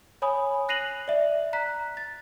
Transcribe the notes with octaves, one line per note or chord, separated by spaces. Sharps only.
C#5 G#5 B5 D#6
F#6 A#6 C7 D#7 F7 F#7
D5 E5
A#5 F#6 B6
A6